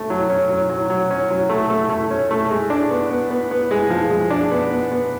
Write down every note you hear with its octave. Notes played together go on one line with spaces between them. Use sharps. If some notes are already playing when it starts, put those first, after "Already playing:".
Already playing: A3
F#3
C#4
F#3
F#3
F#3
C#4
F#3
A3
A3
A3
C#4
A3
G#3
D4
B3
B3
B3
B3
G#3
F3
G#3
D4
B3
B3
B3